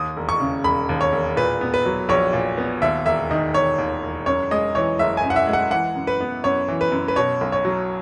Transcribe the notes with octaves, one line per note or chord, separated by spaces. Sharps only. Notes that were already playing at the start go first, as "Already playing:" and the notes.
Already playing: D#2 D#6
E1
C#6
C#3
E1 B5
D#2
C#5
E1
A#2 B4
B3
B4
F#3
A#1 C#5
A#2
B3
D#2 E5
E1 E5
D#3 D#5
E1 C#5
D#2
E1
F#2 C#5
G#3 D#5
E3 C#5
F#1 E5
G#5
F#2
F#5
E5
G#3
F#5
E3 F#5
F#2
B4
B3
F#2 C#5
E3
B4
F#2
B4
B2 C#5
B1
C#5
F#3